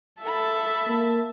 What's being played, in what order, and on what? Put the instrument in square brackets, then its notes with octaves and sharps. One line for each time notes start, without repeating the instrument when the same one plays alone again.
[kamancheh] A4 B5 [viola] E5 A5
[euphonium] A#3